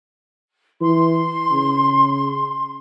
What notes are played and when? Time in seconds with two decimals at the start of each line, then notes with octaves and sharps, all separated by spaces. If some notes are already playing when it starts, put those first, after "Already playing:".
0.81 E3 C6
1.51 C#3